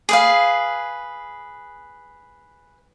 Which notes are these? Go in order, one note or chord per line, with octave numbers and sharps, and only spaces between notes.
G#4 B4 F5